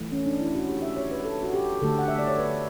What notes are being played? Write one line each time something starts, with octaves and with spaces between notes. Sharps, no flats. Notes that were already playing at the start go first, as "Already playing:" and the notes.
Already playing: E3 A3
C#4
D4
E4
F#4
G4
E5
C#5
B4
A4
F#4
G4
D3 A3 A4
F#5
E5
D5
C#5
B4